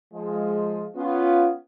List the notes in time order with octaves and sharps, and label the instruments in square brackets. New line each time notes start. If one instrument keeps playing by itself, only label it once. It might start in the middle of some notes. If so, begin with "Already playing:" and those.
[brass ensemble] F3 G#3
B3 C#4 F4